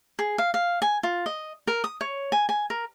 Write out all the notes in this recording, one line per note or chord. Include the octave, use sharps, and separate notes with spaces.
G#4
F5
F5
G#5
F4
D#5
A#4
D#6
C#5
G#5
G#5
A#4